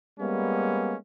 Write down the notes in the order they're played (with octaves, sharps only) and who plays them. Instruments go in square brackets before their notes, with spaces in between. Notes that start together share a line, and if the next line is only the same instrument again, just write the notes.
[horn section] G3 G#3 A#3 B3 C#4